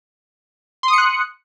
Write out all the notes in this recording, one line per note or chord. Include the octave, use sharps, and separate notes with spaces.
C6 D#6 F#6 C#7